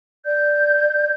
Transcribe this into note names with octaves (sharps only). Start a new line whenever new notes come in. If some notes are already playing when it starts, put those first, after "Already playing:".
D5 G6